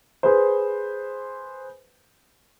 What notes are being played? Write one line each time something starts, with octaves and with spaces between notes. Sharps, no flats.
G#4 B4 C5